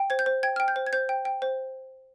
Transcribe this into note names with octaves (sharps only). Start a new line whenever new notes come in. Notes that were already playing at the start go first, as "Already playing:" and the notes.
Already playing: G5
C5 G#6
G6
C5
G5 G#6
G5 F6
G6
C5
G#6
C5 G6
G5
G5
C5